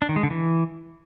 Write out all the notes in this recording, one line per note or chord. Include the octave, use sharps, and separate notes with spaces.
D4
D#3
G#3
D3
E3